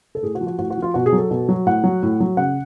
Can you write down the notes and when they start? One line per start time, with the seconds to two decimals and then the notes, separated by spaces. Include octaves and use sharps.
0.15 A4
0.22 A2 G#4
0.35 F#4
0.41 F3
0.47 F#4
0.59 A2 F#4
0.70 F#4
0.77 F3
0.82 F4
0.94 B2 F#4
1.06 G#4
1.12 F#3
1.18 A4
1.31 B2
1.49 F#3
1.66 A2 F#5
1.84 F#3
2.03 A2
2.20 F#3
2.37 C#3 F#5